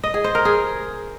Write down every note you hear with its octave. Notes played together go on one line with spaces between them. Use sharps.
D#5
G#4
C5
A#4
G#4